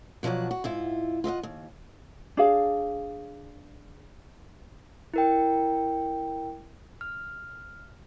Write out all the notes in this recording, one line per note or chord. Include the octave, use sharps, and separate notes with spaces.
B2 F3 F#3 D5 F#5
F#4
G#2 E4 F4
F4 D#5 E5 F#5
D#2
D4 G#4 F5
E4 A#4 G5
F6